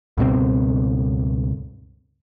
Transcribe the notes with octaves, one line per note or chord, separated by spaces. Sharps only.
C#2 G2 B2 C4